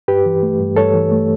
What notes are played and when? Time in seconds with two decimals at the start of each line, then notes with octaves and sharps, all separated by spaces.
0.08 G2 G4 B4
0.26 E3
0.43 A3
0.60 G2
0.76 G2 A4 C#5
0.94 E3
1.11 A3